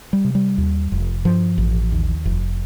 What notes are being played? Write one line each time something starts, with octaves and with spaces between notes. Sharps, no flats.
G3
C3
G3
D#2
F1
G2 F3
A1
D#2
F1